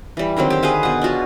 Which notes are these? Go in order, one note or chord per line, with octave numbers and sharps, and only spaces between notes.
E3 G3
D3 D#3 F#3 C4
G4 C5
G#4 B4 C5 F5
B2 F#5
D4 F4 F#4 C#5